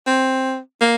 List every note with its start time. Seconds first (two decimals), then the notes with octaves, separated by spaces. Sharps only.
0.07 C4
0.81 A#3